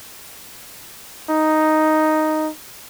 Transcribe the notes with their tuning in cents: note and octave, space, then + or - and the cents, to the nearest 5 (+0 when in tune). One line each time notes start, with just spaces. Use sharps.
D#4 +0